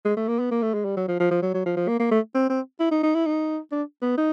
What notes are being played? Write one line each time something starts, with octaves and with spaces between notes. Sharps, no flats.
G#3
A3
A#3
B3
A#3
A3
G#3
G3
F#3
F3
F3
F3
F#3
F#3
F3
F3
A#3
A#3
A3
C4
C4
E4
D#4
D#4
E4
D#4
D4
B3
D#4